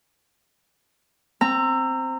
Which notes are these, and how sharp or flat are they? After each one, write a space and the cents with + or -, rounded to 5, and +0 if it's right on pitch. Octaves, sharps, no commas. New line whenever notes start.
C4 +0 A#5 -20 E6 +20